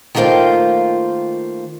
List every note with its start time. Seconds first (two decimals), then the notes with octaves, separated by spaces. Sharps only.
0.15 D#3 A3 A#3 F4 C5 G5